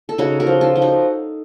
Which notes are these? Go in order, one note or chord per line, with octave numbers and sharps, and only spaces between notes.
A4
C#3 D#4 F#4
F#4 A#4
F3
F4 A4
F3
D#4 F#4